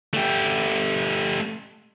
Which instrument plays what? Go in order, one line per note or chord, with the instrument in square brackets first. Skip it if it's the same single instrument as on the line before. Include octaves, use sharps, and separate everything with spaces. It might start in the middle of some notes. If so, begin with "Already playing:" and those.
[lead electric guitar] A3 G4